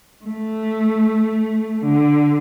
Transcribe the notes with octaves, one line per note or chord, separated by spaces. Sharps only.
A3
D3